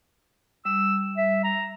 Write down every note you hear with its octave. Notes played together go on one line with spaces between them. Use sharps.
G3 E6
E5
A#5